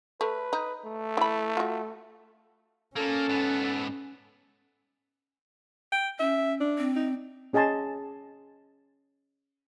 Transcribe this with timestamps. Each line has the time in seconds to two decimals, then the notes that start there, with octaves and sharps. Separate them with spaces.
0.21 A3 B4
0.53 D#4
0.85 A3
1.17 E3 B5
1.57 F4 F#4
2.96 A#3 C#4 F4 A4
3.29 G#2 B3
5.92 G5
6.19 C#4 E5
6.60 D4
6.78 C4
6.96 D#4
7.53 C#4 G#4 D#5 G#5 A5 C6